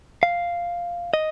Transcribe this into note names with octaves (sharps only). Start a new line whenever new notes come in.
F5
D#5